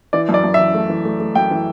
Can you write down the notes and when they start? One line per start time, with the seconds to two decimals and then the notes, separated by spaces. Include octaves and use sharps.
0.13 E3 D5
0.29 F#2
0.34 D5
0.44 F#2
0.54 E3 E5
0.74 A3
0.89 E3
1.05 A3
1.20 A3
1.35 F#2 G5
1.51 E3